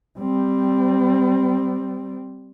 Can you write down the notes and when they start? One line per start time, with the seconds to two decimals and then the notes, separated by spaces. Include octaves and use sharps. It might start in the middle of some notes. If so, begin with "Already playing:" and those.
0.19 G3 C4